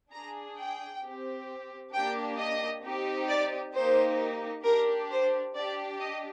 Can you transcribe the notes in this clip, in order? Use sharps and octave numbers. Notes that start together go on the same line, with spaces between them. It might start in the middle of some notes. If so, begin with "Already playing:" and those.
D4 G#4 A#5
G5
C4 G4
A#3 D4 G4 G5
D#5
C4 D#4 G4
D5
A#3 D#4 G4 C5
D4 G4 A#4
C5
D4 G4 D5
D#5